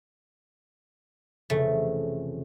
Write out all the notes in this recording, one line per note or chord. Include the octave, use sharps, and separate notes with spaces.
F1 C#3 E3 A3